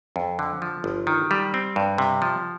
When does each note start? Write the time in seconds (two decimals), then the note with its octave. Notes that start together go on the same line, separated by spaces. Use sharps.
0.16 F2
0.39 D3
0.62 F3
0.84 G1
1.07 D#3
1.31 G3
1.54 C4
1.76 G2
1.98 C3
2.22 F3